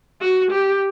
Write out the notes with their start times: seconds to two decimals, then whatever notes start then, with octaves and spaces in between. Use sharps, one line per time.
0.21 F#4
0.51 G4